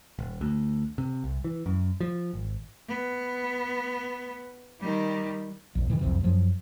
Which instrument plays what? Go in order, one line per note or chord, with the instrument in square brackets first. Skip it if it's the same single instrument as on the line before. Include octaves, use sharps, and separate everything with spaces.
[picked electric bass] D#1
D2
C3
C2
E3
F#2
F3
G#1
[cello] B3
D#3 G3
[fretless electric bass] A#1 E2
G2 C3 D#3 E3
F#1 C2 F2 C3
F#2 F3 F#3